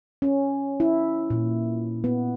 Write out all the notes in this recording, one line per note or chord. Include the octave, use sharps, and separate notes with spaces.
C#4
E4
A#2
B3